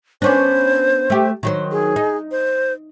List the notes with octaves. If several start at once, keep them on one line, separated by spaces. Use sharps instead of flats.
B3 C#4 D4 C5
A3 G4
D#3 F#3 C5
G#4
D#4
C5